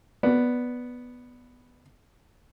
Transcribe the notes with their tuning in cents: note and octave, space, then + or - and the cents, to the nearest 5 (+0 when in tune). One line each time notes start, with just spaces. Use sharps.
B3 +0 D5 +0